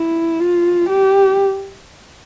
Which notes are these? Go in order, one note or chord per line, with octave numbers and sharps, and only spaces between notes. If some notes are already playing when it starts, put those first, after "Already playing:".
Already playing: E4
F4
G4